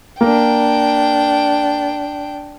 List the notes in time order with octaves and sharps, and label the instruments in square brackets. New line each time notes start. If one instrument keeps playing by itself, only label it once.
[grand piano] A#3 [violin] D4 G5